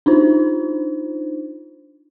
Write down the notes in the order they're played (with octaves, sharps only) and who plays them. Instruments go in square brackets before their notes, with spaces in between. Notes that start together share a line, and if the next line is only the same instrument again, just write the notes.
[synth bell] D4 D#4 F4 C5